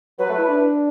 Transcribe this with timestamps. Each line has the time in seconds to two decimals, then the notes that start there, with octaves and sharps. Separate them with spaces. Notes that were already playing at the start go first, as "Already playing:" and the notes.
0.19 F#3 B4
0.29 A3
0.38 E4
0.48 D4